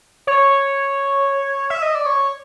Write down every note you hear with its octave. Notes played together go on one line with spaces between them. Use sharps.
C#5
E5
D#5
D5
C#5